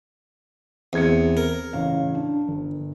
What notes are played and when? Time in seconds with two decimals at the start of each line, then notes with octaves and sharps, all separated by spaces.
0.93 E2 C4 G#6 C#7
1.37 A#4
1.73 A1 C#3 F5
2.14 D4
2.48 G1